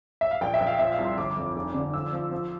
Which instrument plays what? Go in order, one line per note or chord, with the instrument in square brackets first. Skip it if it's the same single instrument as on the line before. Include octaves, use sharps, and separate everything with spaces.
[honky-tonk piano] E5
F5
A#1 G5
E5
A#1
F5
F3 E5
F5
C2
C6
G1 D6
F2
F1
D3
F3 E6
F3
F3